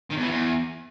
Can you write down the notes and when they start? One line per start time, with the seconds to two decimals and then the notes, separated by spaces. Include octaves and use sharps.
0.10 D#3
0.16 E2
0.22 E3
0.28 E2